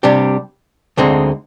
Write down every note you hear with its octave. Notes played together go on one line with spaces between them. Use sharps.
C3 G3 D4 G4
D2 D3 G#3 C4 D#4